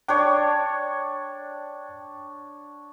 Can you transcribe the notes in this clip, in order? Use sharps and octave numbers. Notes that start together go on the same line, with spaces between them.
D4 C#5 G5